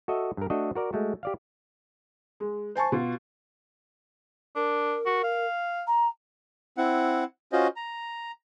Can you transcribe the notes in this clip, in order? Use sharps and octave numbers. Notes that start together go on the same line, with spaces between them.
F#4 A4 D#5 E5
G2 A#4
A3 D4 F#4 A4 D#5
F#4 A#4 D5
G#3 A3 F#4
G4 D5 F5
G#3
C5 G#5 A5 C#6
B2 F4
D4 A#4
F#4
F5
A#5
C4 E4 F#5
C#4 F4 F#4 C5 D#5
A#5